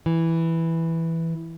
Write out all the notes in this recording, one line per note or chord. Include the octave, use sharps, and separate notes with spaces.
E3